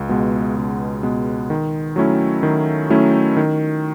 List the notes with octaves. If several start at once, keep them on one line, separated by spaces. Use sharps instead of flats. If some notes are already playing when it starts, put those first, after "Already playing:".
Already playing: C#2
B2 G#3 B3
C#2
B2 G#3 B3
D#3
F#3 A3 C#4 E4
D#3
F#3 A3 C#4 E4
D#3